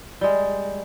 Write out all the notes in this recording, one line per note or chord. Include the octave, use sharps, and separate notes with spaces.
G3 G#3